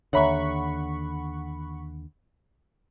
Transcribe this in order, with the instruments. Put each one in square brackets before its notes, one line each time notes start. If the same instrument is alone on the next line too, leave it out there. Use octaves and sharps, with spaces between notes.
[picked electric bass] D#2 D3 [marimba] C#5 E5 A#5 [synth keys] F#5 B5 C#6